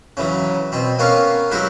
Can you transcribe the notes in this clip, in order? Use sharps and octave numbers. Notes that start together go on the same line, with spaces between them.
C#3 E3 F#3
B2 C4
A#3 B3 C#4 C#5 F5
F#3 G#3 E4 F#4 G4